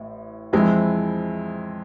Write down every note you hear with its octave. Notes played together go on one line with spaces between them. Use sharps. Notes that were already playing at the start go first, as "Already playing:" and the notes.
Already playing: A1 A2
F2 E3 G#3 C4 E4